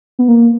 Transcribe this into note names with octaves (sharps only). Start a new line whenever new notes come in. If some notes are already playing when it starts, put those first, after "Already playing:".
B3
A#3